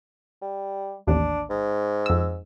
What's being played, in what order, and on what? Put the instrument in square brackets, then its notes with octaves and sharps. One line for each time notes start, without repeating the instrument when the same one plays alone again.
[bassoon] G3
[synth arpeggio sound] A1 D#2 [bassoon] D4
[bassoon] G#2
[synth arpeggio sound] F2 E6